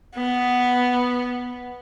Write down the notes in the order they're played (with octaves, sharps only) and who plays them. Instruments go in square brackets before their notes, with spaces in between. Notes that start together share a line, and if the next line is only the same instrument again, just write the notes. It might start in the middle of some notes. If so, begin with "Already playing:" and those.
[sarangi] B3